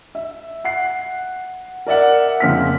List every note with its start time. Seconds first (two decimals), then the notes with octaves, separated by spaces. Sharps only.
0.15 E5
0.64 F#5 C7
1.87 A#4 D5 E5 F#5
2.40 F2 C#3 A#3 C4 F6 B6